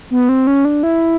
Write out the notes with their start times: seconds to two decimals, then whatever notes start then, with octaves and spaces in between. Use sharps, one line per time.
0.10 B3
0.29 C4
0.47 C#4
0.65 D4
0.83 E4